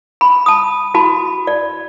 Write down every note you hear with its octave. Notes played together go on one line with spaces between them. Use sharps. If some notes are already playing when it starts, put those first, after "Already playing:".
B5
A5 D#6
E4 F#4 A5 B5
D5